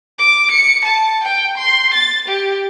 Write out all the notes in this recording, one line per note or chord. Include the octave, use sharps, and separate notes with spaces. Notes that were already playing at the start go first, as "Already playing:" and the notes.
D6
C#7
A5
G5
C6
A6
G4